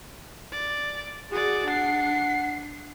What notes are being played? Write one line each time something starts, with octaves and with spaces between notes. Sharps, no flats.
D5
F#4 G#4 D5
D4 F#5 C7